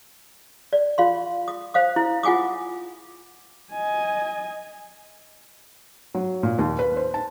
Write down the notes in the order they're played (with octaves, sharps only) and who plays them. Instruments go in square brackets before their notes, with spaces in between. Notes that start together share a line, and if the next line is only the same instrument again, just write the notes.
[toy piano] D5
F4 F5 C6
D#6
C5 F5 D#6
E4
F4 F#5 G#5 D6 D#6
[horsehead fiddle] D#5 G#5
[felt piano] F#3
A#2
D#2
B4
C5
A5